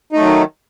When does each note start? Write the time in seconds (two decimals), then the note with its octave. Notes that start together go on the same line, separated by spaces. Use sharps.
0.12 D#4
0.16 A3
0.20 F#3
0.23 D#3